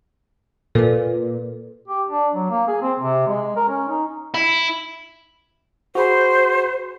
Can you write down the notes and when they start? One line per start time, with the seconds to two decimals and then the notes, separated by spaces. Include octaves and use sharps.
0.75 A#2 A4 B4
1.88 G4
2.09 D4
2.34 F#3
2.50 A#3
2.68 G#4
2.82 C4
2.99 C3
3.28 G#3
3.56 A#4
3.68 C#4
3.88 D#4
4.34 E4
5.95 F#4 G#4 C5 B5